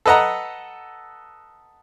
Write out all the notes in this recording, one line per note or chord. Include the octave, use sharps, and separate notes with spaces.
A4 B4 D#5 F#5 A#5